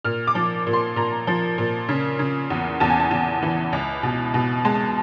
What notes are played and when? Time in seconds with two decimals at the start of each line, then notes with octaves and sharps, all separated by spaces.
0.05 A#2 F6
0.27 D6
0.35 F3
0.67 A#2
0.73 C6
0.96 A#2 A#5
1.27 F3
1.58 A#2
1.89 C#3
2.19 C#3
2.50 E2
2.80 E2 A5
2.90 G#5
3.00 A5
3.11 E2
3.43 E3
3.73 C#2
4.03 B2
4.34 B2
4.65 G#3 A5